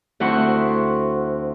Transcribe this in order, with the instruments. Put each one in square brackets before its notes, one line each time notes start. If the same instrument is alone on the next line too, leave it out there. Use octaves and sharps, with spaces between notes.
[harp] D2 C4 E4 F#5 C6 C#6